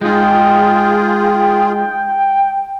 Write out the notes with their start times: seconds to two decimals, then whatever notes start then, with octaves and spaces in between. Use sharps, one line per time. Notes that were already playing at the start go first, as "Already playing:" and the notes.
0.01 G#3 D#4 F4 G#4 G5